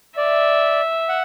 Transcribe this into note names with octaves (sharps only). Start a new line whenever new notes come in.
D5 E5
F#5